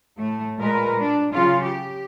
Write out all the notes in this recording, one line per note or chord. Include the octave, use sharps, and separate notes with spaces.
A2 A3
A#2 G#3 A#4 B4
D4
C#3 F#3 F4
G4